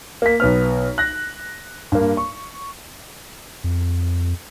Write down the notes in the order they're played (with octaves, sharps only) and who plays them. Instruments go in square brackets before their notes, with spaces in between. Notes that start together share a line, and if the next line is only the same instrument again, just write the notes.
[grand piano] A#3 B6
B1 B3 F6
F#6 A#6
G2 A#3
C#6
[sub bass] F2